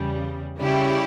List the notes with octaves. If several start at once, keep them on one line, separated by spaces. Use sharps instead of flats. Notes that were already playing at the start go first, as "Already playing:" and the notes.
Already playing: E2 C#3 G3
C#3 G3 C#4 E4 G4